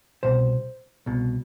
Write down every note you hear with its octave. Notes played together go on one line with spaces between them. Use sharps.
C2 B2 C5
C2 B2